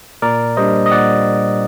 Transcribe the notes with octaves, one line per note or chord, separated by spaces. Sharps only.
A#2 A#4 D5
G3 A#3 D4 C5 D#5
D#5
A#2 D5 F#5